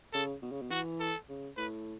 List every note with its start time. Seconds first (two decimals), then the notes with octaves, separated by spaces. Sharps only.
0.14 C#3 A4
0.42 B2
0.52 C#3
0.62 B2
0.71 E3 F#4
1.00 A4
1.29 C#3
1.57 A2 B4